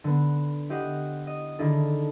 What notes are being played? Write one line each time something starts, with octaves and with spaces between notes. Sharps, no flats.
D3 B3
E4 G4 C5 D#5 F#5
D#5
D3 D#3 D4 E4 G#4 A4